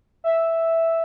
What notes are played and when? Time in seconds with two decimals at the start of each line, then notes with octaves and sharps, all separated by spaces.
0.24 E5